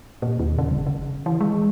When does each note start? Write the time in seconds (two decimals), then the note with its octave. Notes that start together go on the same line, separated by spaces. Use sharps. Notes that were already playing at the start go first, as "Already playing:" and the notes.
0.22 A#2
0.39 D#2
0.58 C#3
0.71 F#1
0.87 C#3
1.26 E3
1.41 G#3